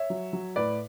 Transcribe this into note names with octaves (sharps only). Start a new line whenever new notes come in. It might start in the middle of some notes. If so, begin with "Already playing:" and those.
Already playing: C#5 E5
F#3
F#3
A2 B4 D5